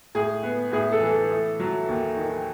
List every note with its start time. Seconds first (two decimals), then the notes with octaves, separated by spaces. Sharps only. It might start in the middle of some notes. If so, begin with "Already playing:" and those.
0.15 A2 G#4
0.43 B3
0.72 A2 G#4
0.92 A4
1.01 E3
1.11 A4
1.31 A3
1.60 F#3
1.88 D#2
2.17 D#3